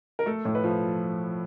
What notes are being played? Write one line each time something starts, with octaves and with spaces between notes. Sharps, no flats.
A#4
A3 A4
A2
B4
F3